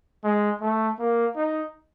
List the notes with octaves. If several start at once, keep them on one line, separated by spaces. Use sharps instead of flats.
G#3
A3
A#3
D#4